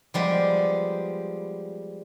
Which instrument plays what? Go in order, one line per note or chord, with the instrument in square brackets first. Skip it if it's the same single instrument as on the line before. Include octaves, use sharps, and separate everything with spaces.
[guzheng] F3 G3 G#3 B3